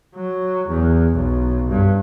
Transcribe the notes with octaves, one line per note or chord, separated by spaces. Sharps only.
F#3
E2
B1
G2